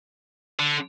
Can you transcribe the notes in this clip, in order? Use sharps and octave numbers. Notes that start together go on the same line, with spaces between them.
D3